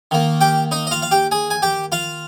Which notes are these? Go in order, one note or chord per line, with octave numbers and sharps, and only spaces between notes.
D#3 A#3
G4 G5
D#4 D#5
D#5
F4 F5
F5
G4 G5
G#4 G#5
G#5
G4 G5
F4 F5